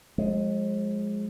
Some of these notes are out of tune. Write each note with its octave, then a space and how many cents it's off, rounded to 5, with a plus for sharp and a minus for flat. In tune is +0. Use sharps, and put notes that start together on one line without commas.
F3 +40 G#3 +0